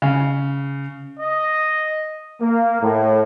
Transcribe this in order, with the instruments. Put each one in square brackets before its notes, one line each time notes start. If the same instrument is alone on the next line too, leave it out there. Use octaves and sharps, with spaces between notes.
[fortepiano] C#3
[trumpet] D#5
[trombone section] A#3
A2